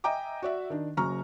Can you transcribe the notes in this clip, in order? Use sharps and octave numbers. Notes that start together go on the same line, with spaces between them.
D#5 E5 G5 G#5 A#5 D6
F#4 D5 E5
D#3 D4
F#1 F#2 C#3 A#5 C#6 F6